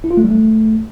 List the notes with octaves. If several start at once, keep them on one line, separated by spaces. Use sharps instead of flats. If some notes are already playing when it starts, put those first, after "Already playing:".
E4
F4
A3
G3
A3